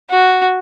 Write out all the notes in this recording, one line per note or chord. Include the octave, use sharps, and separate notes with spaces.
F#4